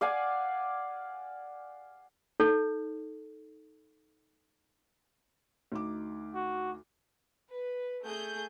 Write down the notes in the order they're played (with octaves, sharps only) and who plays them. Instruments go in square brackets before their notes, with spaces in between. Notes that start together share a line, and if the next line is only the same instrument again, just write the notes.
[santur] D5 F5 F#5 G#5
[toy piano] D#4 A4 C#5
[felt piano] D2 D#4 D6
[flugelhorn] F#4
[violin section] B4
A3 G#4 G6